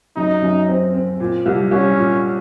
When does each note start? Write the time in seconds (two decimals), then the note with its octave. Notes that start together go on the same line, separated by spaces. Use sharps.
0.16 F#2 D#4
0.42 F#2
0.68 C4
0.94 C4
1.20 A#2
1.46 C2
1.71 C2 C#4
1.97 A#2